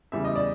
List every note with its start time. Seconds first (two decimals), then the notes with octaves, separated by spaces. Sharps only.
0.12 E2 C#3 E3 G3 E5
0.25 D#5
0.36 D5